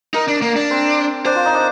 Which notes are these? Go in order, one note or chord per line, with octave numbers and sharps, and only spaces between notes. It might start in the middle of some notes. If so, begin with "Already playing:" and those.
D#4 A#4
D4
A#3
D4
C4
D4 C5
F4
D#4
D4